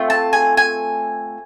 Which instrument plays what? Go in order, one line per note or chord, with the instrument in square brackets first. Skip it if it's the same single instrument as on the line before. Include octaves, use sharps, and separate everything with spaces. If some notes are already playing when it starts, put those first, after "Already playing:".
Already playing: [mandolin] A3 C4 F4
A5
G#5
G#5